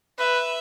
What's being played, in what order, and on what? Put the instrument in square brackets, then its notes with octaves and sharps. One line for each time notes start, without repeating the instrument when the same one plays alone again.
[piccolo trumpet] B4 [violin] E5